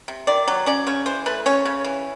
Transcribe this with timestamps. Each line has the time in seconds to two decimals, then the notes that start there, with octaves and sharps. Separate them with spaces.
0.08 C3
0.27 D#3 D5
0.48 F#3
0.66 C#4 D5
0.87 C#3 C#5
1.06 E3 C5
1.26 A3 B4
1.46 C#4 C#5
1.65 C#3
1.84 E3